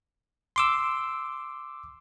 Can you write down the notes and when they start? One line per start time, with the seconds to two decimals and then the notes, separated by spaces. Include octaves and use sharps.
0.56 C6 D6 E6